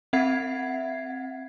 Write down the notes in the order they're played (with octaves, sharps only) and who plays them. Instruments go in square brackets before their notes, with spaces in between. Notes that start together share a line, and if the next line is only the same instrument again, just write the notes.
[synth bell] C4 E5 F#5 G#6 C7